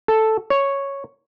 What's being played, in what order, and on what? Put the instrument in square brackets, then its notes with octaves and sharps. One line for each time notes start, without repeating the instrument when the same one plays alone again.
[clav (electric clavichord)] A4
C#5